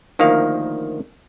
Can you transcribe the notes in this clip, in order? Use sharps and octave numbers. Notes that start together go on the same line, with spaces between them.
D2 D#3 F3 A#3 F5